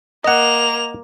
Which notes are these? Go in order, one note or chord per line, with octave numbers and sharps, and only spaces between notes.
A#3 D#5 F#5 F7